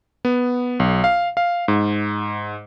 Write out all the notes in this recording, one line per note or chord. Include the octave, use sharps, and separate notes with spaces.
B3
B1
F5
F5
G#2